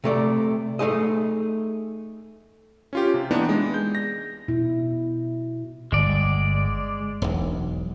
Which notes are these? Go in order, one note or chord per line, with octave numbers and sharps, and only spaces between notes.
C3 A3 D5
A3 D#4 G#4 D#5
C#4 F4 G4
C3
E3 A#3 B3 D4 D#4
G#3
G6
A#6
B2 E4
G1 G#3 D5
E1 B1